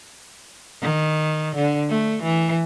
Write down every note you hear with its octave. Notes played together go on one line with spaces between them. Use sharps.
D#3
D3
A3
E3